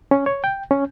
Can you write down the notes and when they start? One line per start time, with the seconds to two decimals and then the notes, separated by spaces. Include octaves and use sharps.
0.11 C#4
0.26 C#5
0.44 G5
0.71 C#4